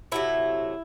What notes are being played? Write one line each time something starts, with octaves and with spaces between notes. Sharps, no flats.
C3 F#3 A3 E4